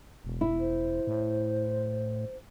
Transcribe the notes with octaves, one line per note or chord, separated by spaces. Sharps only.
E1
E4
C5
A2